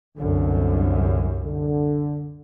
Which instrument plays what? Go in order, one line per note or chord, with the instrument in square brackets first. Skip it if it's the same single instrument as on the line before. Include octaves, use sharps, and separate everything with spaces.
[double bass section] C2 F#2 [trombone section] D3
[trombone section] D3